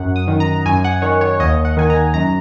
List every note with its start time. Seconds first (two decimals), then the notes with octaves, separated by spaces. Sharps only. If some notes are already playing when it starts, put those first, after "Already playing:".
Already playing: F#2 F#5
0.16 D#6
0.28 D#3
0.40 A#5
0.65 F#2 G#5
0.84 F#5
1.02 D#3 C#5
1.21 C#5
1.40 D#2 D#5
1.65 F#5
1.77 D#3 G#5
1.90 A#5
2.14 F#2 A#5